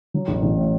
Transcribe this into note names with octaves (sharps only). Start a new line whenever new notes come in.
F#3
A1
A1
A2